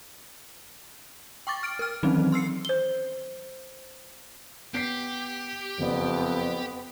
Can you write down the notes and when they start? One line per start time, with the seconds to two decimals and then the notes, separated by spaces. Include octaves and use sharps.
1.47 G5 C#6 D6 A6
1.63 F6 D7
1.79 A#4 F6
2.03 D#3 E3 F#3 C4 C#4 D#4
2.32 C6 E6 C7 C#7
2.65 C5 G7
4.74 B3 G4 B6 C7
5.79 F#1 F2 B3 D5